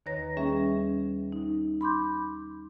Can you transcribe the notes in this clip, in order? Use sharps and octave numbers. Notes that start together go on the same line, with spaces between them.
D#2 D#3 B4 C#5 A#5 A#6
G3 A#3 C#4 G#4 E5
D#4
B5 C6 D6 G6